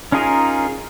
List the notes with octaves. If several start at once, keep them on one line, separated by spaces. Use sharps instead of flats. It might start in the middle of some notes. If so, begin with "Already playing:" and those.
C#4 D#4 F4 G#4 A#4